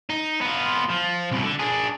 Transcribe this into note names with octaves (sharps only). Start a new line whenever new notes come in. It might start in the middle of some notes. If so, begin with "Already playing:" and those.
D#4
B3 F4
F3
C2 B2
D3
D4 G#4